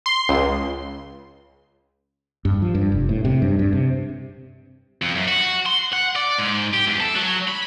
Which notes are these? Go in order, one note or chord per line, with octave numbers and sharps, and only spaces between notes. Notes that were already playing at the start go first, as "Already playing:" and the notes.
C6
C#2
G2
F3
G2
F1
A2
C3
G2
G2
C3
F2
F#2
F#4
C6
F#5
D5
G#2
G4
E2
A4
F#3
B5